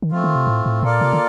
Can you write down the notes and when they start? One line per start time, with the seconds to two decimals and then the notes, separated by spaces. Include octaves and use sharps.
0.02 D#3
0.11 F3 A3 C4 F4
0.24 D#3
0.35 C3
0.47 A2
0.66 A2
0.82 A#2 A#3 F4 A4 D5 F5
1.01 C3
1.13 D3